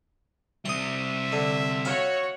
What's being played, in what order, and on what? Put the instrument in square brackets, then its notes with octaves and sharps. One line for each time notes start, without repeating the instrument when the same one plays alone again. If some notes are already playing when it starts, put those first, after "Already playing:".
[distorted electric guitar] C3 G3 [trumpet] E5 [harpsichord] C6 D#6
[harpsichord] D3
[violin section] F#4 C#5 [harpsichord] F5